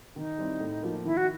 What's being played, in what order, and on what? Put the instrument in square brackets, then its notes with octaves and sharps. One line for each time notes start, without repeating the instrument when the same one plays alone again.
[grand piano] D#3 [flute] D#4
[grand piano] G3 C4 E4
A2
F3 A#3
[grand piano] D#3 [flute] E4
[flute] F#4